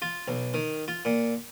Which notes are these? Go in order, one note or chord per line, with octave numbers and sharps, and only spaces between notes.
F4
B1
D#3
F4
A#2